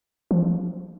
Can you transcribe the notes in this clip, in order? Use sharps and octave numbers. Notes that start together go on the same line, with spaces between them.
F3